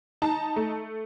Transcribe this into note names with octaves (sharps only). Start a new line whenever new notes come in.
D#4 A5
A3